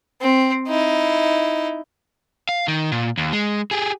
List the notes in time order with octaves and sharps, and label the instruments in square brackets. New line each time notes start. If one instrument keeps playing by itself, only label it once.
[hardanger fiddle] C4
D#4 E4
[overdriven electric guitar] F5
D#3
A#2
D#2
G#3
G4 G#4